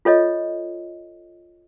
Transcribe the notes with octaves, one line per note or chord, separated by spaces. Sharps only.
F4 A4 C#5 D#5